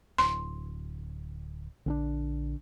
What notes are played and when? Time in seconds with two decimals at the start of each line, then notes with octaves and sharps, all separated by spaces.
0.18 D1 C6
1.86 A#1 D3 C4 D4